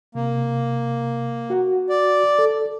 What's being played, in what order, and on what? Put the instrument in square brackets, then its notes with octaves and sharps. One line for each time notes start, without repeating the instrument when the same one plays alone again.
[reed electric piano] C3 [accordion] A#3
[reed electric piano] F#4 F#5
[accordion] D5
[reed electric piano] A4